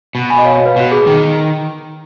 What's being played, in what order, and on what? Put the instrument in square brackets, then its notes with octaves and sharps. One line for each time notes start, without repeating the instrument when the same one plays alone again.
[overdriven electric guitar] B2
[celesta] G#5 B5
D#5
C#5 F5
C#5
B4
[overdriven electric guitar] B2 [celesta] F#4
[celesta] G#4
[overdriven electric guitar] D#3